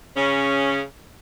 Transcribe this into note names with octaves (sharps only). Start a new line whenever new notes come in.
C#3 C#4